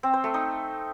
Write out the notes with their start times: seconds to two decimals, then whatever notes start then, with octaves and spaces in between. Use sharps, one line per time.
0.03 C4
0.13 C5
0.24 A3
0.34 D#4